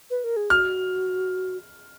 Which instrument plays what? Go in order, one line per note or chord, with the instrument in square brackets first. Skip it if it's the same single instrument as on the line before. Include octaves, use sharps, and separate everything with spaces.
[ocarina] B4
A#4
G#4
[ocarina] F#4 [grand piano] F6